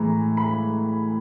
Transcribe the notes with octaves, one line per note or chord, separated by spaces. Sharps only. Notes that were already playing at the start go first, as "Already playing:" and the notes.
Already playing: A2 E3 G#3 A#5
B5